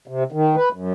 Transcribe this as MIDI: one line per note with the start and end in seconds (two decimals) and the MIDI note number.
0.08 0.24 48
0.32 0.56 51
0.56 0.69 71
0.73 0.93 42